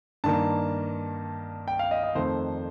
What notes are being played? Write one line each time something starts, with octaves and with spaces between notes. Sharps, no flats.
G2 D#3 A#3 A5
G5
F5
D#5
D#5
F2 D#3 A3 C5